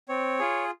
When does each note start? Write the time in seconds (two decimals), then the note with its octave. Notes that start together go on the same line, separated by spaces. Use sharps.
0.08 C4 C#5
0.39 F4 G#4